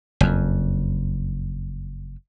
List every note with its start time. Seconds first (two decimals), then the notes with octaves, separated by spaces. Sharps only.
0.21 F#1 F2